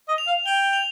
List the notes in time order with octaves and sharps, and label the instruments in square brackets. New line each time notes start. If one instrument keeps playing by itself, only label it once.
[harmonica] D#5
[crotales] F7
[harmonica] F5
[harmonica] G5 [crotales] G7
[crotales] F7